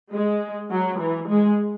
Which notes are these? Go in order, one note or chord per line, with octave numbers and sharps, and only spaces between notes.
G#3
F#3
E3
G#3